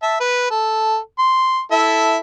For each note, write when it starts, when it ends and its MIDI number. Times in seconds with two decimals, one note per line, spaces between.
0.02 0.16 76
0.02 0.16 81
0.20 0.46 71
0.51 0.97 69
1.19 1.60 84
1.71 2.17 64
1.71 2.17 69
1.71 2.17 76